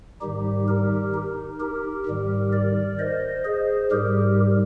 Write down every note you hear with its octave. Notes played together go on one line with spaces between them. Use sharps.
G#2 D#3 G3 D#4 G4
G4 A#4
D#4
G4 A#4
G#2 D#3 G3
A#4 D5
C5 D#5
G#4 C5
G#2 G3 G4 A#4